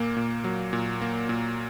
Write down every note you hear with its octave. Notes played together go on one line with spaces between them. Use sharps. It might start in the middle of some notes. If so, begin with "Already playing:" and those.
Already playing: A#2 A#3
A#2
F#3
A#2
A#3
A#2